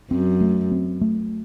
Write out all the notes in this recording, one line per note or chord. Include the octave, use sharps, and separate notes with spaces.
F#2 C4
A3
C4
A3